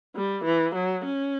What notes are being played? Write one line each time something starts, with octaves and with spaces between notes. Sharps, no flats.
G3
E3
F#3
C#4